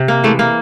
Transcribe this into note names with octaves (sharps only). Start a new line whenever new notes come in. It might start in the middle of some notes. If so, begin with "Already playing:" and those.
Already playing: C3
A#3
E3 G#3 A3
A#3